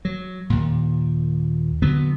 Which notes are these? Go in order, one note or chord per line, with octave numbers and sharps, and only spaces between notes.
F#3
D#2 A#2
D3 F#3 B3